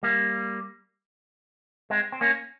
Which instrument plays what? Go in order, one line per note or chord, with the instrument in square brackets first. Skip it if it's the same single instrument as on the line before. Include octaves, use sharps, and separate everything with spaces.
[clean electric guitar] G3 A#3
G#3 C4
C4
A#3 C#4